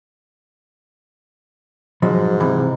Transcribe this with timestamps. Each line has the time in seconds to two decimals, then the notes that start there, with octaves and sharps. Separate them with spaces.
2.02 G#2 B2 F3 F#3
2.40 C3 E3